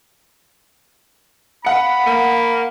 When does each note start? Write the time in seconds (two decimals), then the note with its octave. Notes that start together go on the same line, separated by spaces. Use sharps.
1.65 F5 F#5 B5 C#7
2.06 A#3